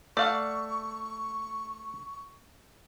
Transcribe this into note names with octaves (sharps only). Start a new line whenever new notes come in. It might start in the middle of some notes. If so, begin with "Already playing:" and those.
A3 D5 F5 F#5 C#6